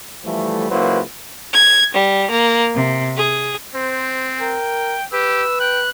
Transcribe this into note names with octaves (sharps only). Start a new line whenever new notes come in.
E3 F3 G3 A3
C#2 F#3 A#3 E4 B4 C5
G#6
G3
A#3
C3
G#4
C4 C5
A#4 G5
G4 B4 E6
G5 F#6